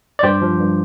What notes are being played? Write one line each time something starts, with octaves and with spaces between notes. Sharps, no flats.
D5
G2 G4 C5
F3
G2